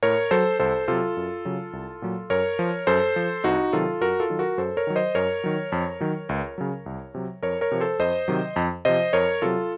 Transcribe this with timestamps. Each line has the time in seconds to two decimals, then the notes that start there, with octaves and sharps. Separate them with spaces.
0.03 A2 A#4 C#5
0.31 F#3 A4 C5
0.60 C2 A4 C5
0.88 C3 F#3 F4 A4
1.17 F#2
1.45 C#3 F#3
1.73 C2
2.02 A#2 F#3
2.30 F#2 A#4 C#5
2.59 F3
2.87 F#2 A4 C5
3.16 F3
3.44 C2 D#4 F#4
3.73 C3 D#3 F#3 F4 A4
4.01 F#2 F#4 A#4
4.20 F4 A4
4.30 D#3 F#3
4.39 F#4 A#4
4.58 F#2 A4 C5
4.77 A#4 C#5
4.87 D#3 F#3
4.96 C5 D#5
5.15 F#2 A#4 C#5
5.44 D#3 F#3
5.72 F2
6.00 D#3 F#3
6.29 C#2
6.58 C#3 F#3
6.86 C2
7.14 C3 F#3
7.43 F2 A#4 C#5
7.61 A#4 C#5
7.72 C3 F3
7.81 A4 C5
8.00 F2 C5 D#5
8.28 C3 D#3 F#3
8.56 F2
8.85 C3 F3 C5 D#5
9.13 F2 A#4 C#5
9.42 C3 F#3 F4 A4